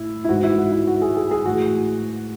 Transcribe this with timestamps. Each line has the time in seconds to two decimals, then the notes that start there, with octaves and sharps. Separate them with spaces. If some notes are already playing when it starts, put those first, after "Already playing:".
Already playing: A2 E4
0.24 E4
0.29 G#2 E3 F#4
0.43 E4
0.58 F#4
0.72 E4
0.87 F#4
1.02 G#4
1.17 G#4
1.31 G#4
1.45 A2 E3 F#4